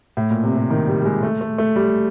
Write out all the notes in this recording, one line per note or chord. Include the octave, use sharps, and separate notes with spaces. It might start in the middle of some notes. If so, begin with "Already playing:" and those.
A2
A#2
C3
C3
D#3
G3
G3
G#3
A3
A3
A3
G3